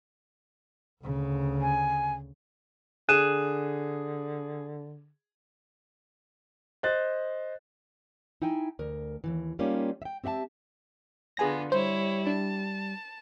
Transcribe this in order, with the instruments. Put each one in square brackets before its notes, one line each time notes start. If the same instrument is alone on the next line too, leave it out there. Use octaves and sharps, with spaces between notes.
[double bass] D2 C#3
[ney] G#5
[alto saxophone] D3 [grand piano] G#4 [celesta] F#6 D#7 E7
[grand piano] C5 D#5 F#6 A6
[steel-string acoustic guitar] D#4 E4 G5 G#5
D2 A#4
D#2 G#2 E3
G3 A#3 C#4 D#4 F4 G4
E5 G5
C4 G4 E5 F#5 A5
[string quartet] D3 B3 F4 [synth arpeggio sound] G#4 G#5 A#6
[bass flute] G3 [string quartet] E4 C#5 [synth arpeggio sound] C5
[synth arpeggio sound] D4 [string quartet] A5